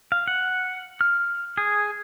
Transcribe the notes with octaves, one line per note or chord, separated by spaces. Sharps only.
F5
F#5
F6
G#4